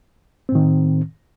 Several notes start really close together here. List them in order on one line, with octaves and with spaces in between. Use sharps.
C4 A2 D#3